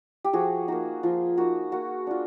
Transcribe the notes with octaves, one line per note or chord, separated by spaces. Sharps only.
G4
F3 F#4 G#4
A#3 D#4 F#4
F3 F4
A#3 D#4 F#4
A#3 F#4
D4 F4